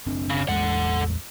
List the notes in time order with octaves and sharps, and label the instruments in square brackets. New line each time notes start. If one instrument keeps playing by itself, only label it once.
[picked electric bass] F#1 C4 D4
[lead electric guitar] C#3
[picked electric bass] A1 E2 G#3 [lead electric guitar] A4 F#5